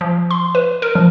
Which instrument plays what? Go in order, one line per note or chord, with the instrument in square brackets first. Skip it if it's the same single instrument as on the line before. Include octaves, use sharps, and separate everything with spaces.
[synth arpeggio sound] F3
C6
B4
A#4
F3